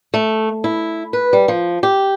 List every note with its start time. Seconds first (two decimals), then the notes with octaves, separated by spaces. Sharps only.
0.14 A3
0.64 E4
1.13 B4
1.33 G3
1.48 F3
1.83 G4